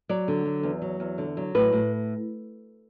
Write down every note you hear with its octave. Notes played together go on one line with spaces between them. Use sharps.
F#3 D5
D3
F#3
E2
F#3
E2
D3
F#3
A2 B4
A2